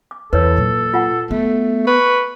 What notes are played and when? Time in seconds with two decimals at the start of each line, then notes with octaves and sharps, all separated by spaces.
0.11 D6
0.33 E2 A4 B4 C#5
0.57 A#2 F#3
0.94 F4 F#5
1.31 A3 B3
1.87 B4 C#6